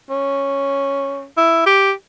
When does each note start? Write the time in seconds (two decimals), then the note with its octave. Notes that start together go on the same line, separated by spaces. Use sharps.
0.10 C#4
1.37 E4
1.66 G4